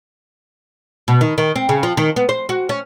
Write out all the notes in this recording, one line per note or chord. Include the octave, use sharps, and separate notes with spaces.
B2
D#3
D#3
C4
C#3
F3
D#3
B3
C5
F#4
C#4